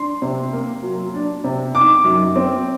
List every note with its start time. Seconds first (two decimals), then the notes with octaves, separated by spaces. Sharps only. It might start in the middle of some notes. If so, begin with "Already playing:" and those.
Already playing: D4 C6
0.22 C3
0.53 A#3
0.83 F#3
1.14 D4
1.44 C3
1.75 D#4 D6
2.04 F#2
2.36 C4